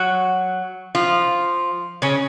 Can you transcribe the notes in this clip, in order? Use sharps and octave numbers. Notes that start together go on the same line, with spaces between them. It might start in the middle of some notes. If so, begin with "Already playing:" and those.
Already playing: F#3 F#4
F3 F4
C#3 C#4